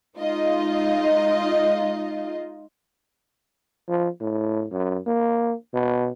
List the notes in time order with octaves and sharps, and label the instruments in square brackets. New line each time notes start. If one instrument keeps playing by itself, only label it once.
[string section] G#3 D#4 F4 D#5
[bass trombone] F3
A2
F#2
A#3
B2